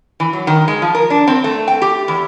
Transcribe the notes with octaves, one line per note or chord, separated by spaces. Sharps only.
E3
F#3
D#3
G#3
F3
A#4
D4
C4
A3
G5
G4
E2